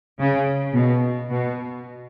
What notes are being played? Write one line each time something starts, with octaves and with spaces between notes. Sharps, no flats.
C#3
B2
B2